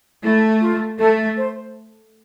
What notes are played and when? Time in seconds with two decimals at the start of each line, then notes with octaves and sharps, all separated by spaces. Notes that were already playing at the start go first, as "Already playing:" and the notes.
0.23 A3 E4
0.61 F4
0.99 A3 A4
1.38 C5